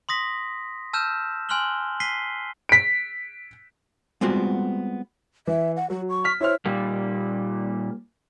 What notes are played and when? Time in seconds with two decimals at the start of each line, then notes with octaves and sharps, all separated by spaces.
0.09 C6 D#6 A#6 B6
0.93 A5 E6 F6 G6 E7
1.49 G#5 C6 F6 F#6 F#7 G7
2.00 B6 C7 D#7 G7
2.69 B6 D7
4.21 G3 G#3 B3 C4 F4 F#4
5.47 E3 E5
5.76 F#5
5.90 F#3 F#4
6.09 C#6
6.24 F6 B6
6.41 E4 C5 C#5 F6
6.65 A#2 G3 A#3